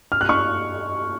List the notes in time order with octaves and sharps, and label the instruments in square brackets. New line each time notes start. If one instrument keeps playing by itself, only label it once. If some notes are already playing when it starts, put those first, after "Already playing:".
[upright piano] F6
F#6
C#6 F6